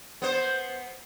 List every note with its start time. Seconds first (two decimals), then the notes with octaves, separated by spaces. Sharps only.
0.22 B3 C5